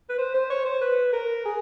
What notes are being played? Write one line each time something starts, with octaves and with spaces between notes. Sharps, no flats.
B4
C5
C5
C#5
C5
B4
A#4
G#4